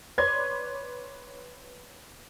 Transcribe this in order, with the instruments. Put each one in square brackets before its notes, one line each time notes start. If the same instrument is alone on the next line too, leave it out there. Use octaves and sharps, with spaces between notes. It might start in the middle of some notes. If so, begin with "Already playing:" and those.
[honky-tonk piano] B4 C#5 D5 C6 G#6